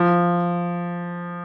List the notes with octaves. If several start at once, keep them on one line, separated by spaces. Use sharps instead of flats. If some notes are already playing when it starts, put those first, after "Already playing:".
Already playing: F3